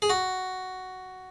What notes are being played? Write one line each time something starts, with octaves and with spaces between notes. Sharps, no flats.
G#4
F#4